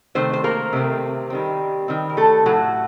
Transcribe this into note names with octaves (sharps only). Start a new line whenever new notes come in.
C3 D#3 A3 C4 C5
C5
A#3 A#4
C3 D#3 A3 C4
D#3 G3 C4
D#3 G3 C4
A#4
A3 A4
A2 F#3 A3 F#4